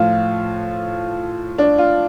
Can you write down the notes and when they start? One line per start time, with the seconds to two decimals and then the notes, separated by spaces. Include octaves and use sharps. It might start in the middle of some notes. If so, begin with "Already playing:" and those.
Already playing: A2 F3 F4
1.58 D4
1.78 F4